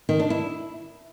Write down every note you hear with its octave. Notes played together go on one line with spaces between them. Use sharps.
D#3
D4
E4